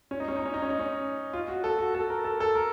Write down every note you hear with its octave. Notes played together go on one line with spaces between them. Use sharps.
C#4
D#4
C#4
D#4
C#4
D#4
C#4
D#4
C#4
F4
F#4
A4
F#4
A4
A#4
A4
A4
A#4